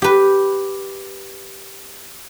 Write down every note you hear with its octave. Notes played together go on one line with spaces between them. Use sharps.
G4 B4